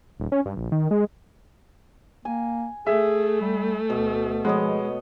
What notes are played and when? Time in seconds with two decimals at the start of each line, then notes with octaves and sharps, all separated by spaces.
0.20 D#1
0.32 C#4
0.46 G2
0.57 A#1
0.72 D#3
0.91 G#3
2.25 A#3 G#5
2.87 A3 G#4 E5
3.41 G3
3.90 D2 B2
4.45 F3 G#3 B3 C#5 D#5